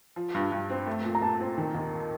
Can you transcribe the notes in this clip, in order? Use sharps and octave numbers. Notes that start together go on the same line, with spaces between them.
F3
G2
G2
C4
A3
A#2
A#5
A#2 A5
C4
D#3
D#2